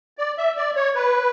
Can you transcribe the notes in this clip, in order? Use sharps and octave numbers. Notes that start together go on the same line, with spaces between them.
D5
E5
D5
C#5
B4